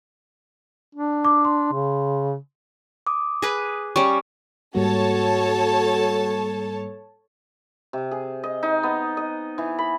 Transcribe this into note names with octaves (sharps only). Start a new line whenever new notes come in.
D4
D6
C6
C#3
D6 D#6
G#4 B4
G3 C#4 C#6
G#2 G3 A#3 F#4 A4 C#5 A5
C3
G#4
D#5
D#4
B3
D#5
E3
B5